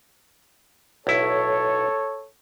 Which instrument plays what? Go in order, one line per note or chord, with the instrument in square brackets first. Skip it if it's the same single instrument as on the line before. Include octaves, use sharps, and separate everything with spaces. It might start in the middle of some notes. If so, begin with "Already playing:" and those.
[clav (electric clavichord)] B1 E4 [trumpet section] A4 C#5